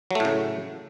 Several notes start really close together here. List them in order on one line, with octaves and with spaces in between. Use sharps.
F#3 A3 A2 C#3